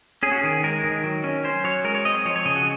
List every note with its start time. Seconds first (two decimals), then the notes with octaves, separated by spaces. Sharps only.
0.23 C#4 G#4
0.32 F#4
0.41 D#3 G#4
0.63 G#3 A#4
0.84 D#3
1.04 F#3
1.24 C#4
1.44 C#4 C5
1.64 F#3 C#5
1.84 G#3 A#4
1.95 C#5
2.05 C4 D#5
2.25 F3 C#5
2.36 C#5
2.45 C#3 D#5
2.56 F#4